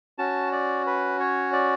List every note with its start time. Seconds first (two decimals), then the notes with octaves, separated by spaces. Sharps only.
0.18 C#4 F#4 A5
0.52 D5
0.87 B4
1.20 C#5
1.53 D5